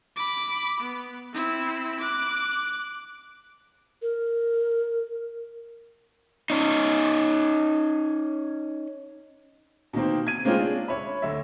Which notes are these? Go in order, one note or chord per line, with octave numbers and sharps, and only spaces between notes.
B5 D6
B3
C4 E4
D6 F#6
A#4
C#4 D#4
B2 D#3 A#3 C4
G#6 D#7
G#3 A#3 C4 C#4 F4 G#4
D4
C#5 E5 B5
D2 E5